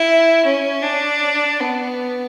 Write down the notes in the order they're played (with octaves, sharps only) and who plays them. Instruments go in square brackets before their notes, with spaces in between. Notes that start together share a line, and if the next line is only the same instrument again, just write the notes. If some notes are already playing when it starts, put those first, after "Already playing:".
Already playing: [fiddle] E4
C#4
D4
B3